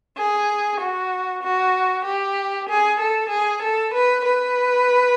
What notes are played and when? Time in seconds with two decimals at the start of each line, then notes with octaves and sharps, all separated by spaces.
0.17 G#4
0.80 F#4
1.43 F#4
2.05 G4
2.68 G#4
2.99 A4
3.30 G#4
3.63 A4
3.93 B4
4.25 B4